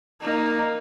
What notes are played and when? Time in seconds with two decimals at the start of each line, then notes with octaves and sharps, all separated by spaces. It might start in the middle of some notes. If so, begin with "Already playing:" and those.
0.21 A#3 D#4